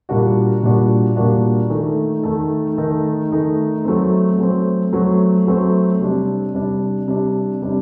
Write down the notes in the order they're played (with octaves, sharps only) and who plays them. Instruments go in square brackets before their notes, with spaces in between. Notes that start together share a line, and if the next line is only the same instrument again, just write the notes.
[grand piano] A#2 G3 A#3 D4 F#4
A#2 G3 A#3 D4 F#4
A#2 G3 A#3 D4 F#4
D#3 A3 D#4 A4
D#3 A3 D#4 A4
D#3 A3 D#4 A4
D#3 A3 D#4 A4
F#3 A3 C4
F#3 A3 C4
F#3 A3 C4
F#3 A3 C4
C3 G3 D4
C3 G3 D4
C3 G3 D4
C3 G3 D4